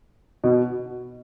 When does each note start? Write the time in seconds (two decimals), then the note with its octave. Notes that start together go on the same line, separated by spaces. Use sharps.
0.44 B2